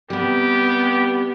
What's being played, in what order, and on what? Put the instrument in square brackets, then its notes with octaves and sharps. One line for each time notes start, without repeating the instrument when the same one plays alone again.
[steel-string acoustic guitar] C3 G3 [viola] B3 [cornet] G4